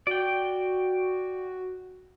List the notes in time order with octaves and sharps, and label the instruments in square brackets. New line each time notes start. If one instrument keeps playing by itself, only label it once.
[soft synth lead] F#4 [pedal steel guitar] D5 G5